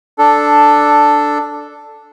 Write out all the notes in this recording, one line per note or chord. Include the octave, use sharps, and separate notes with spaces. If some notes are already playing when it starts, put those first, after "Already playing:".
D4 A4